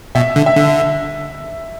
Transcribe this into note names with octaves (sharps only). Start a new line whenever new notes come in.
B2 E5
D3
E5
D3